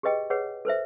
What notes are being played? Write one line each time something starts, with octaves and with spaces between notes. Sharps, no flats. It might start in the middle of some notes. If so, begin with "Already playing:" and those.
G4 G#4 B4 D#5 G5
G#4 B4 C#5 F#5
A4 B4 C5 E5